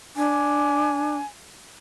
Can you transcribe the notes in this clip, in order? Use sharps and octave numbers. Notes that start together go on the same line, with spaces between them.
D4 G#5